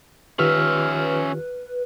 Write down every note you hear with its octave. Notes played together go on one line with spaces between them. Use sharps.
D#3 C#4 F4 G4 B4 E5 F6